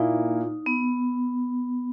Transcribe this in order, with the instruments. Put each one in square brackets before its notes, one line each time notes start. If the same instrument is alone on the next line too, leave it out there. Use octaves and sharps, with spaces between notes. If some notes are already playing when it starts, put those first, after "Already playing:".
Already playing: [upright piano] A#2 A#3 E4 [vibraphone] D#4
[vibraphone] B3